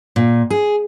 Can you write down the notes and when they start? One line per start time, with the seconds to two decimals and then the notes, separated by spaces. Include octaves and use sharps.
0.16 A#2
0.50 G#4